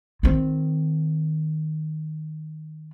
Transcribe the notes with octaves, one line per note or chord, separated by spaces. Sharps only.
D#3 C4